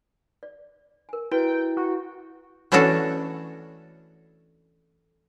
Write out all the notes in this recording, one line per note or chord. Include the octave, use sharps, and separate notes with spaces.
D5
A#4 G#5
E4 F#4 B4 G5
F#4
E3 A3 C#4 D4 F#4 A4